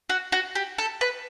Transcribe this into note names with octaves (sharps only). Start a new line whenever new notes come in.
F#4
F#4
G4
A4
B4